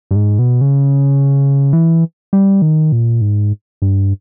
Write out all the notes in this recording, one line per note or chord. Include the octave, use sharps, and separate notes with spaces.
G2
G#2
B2
C#3
E3
G3
D#3
A#2
G#2
G2